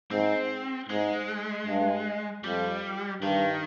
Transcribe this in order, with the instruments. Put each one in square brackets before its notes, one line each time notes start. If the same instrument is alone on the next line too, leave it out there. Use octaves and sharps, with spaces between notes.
[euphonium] G#2 [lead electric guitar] C4
[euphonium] G#2 [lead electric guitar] G#3
[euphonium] G2
[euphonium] F2 [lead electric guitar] G3
[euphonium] G2 [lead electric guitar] D#3